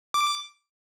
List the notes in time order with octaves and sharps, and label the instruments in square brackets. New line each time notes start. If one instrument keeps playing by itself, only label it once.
[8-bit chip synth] D6